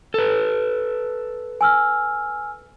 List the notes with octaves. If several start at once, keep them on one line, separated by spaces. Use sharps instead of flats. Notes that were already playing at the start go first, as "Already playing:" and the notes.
A4 B4
G#5 E6 F6